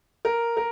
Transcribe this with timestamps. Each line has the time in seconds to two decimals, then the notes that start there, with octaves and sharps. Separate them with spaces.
0.25 A#4
0.57 A#4